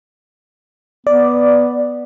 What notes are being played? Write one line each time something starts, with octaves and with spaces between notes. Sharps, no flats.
B3 D5